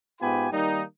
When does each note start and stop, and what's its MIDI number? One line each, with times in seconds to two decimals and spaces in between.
0.21 0.47 44
0.21 0.47 59
0.21 0.47 65
0.21 0.47 67
0.21 0.47 80
0.21 0.47 83
0.53 0.83 51
0.53 0.83 55
0.53 0.83 58
0.53 0.83 63